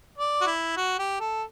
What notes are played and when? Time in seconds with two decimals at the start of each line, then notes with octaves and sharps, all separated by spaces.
0.18 D5
0.41 F#4
0.47 E4
0.76 F#4
0.99 G4
1.20 A4